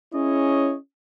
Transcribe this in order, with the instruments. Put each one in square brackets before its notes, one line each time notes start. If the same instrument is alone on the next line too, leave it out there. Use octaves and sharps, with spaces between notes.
[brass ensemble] C#4 E4 G#4 C#5 D#5